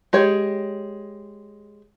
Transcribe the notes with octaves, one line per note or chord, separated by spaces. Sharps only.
G#3 G4 C#5